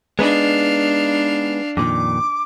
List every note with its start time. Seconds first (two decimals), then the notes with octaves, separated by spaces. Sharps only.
0.19 G#3 B3 D4 D#4 F5
1.77 F2 A#2 D#3 D6